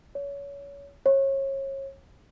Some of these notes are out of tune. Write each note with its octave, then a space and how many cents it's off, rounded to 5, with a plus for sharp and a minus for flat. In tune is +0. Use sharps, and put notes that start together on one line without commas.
C#5 +25
C#5 -30